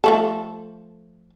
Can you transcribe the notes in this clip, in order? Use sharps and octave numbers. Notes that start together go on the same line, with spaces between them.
F3 A3 A4